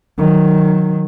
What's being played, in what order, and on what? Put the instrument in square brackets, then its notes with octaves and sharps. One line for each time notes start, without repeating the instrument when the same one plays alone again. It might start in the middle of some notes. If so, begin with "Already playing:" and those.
[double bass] D#3 F#3